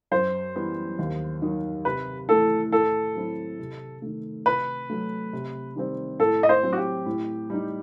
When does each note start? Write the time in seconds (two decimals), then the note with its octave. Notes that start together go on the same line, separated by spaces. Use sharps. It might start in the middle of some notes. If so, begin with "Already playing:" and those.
0.11 F#2 C5
0.56 E3 G3 B3
0.99 D#2
1.42 D#3 F#3
1.85 C3 B4
2.29 E3 A3 E4 A4
2.72 A2 A4
3.15 F#3 C4 E4
3.59 C3
4.02 D#3 A3
4.46 C3 B4
4.90 F#3 A3
5.33 C3
5.76 D#3 G3 C4
6.20 A2 A4
6.43 D#5
6.49 C5
6.63 F#3 C4
6.73 F#4
6.77 G4
7.06 A2
7.50 G3 D#4